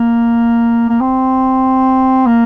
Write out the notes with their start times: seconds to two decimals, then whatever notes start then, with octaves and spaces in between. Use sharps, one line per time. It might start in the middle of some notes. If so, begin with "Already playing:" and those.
Already playing: A#3
0.89 A#3
1.00 C4
2.26 A#3